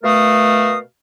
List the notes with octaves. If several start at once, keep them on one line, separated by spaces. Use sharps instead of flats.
B2 A3 A#4 F5 D#6